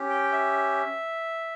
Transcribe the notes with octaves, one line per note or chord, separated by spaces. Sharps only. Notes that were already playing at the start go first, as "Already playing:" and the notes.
Already playing: C#4 G4
G5
E5